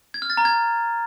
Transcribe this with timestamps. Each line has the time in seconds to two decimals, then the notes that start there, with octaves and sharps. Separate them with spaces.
0.14 G#6
0.22 F6
0.30 A6
0.37 A#5
0.45 G#6